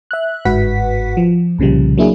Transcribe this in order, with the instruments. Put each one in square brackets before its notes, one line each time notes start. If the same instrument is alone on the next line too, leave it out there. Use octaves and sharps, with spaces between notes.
[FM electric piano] E5 F#6
G1 G#2 F#4 B4 F#5 B6
F3
C2 A#2 C#3 F3 G3
F#3 A#3 D4 E4 G#4